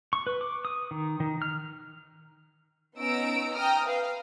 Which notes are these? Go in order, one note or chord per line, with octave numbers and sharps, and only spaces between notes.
C#6
B4
D6
D#6
D#3
D#3
F6
B3 C#4 D#4 A#5 E6 D7
G5 A#5 D#6 F6
B4 F5